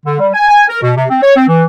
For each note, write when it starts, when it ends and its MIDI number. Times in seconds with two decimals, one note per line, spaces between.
0.06 0.16 50
0.20 0.29 55
0.34 0.47 80
0.48 0.65 80
0.69 0.80 70
0.83 0.91 47
0.97 1.05 48
1.10 1.20 60
1.23 1.35 73
1.37 1.48 60
1.48 1.65 52